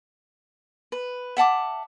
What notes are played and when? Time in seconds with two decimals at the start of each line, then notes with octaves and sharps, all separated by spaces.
0.92 B4
1.37 E5 F#5 A5 D6